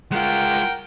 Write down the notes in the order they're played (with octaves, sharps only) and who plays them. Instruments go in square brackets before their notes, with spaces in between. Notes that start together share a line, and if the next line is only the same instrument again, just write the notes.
[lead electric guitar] G#3 F4 [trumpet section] A#4 F#5 G5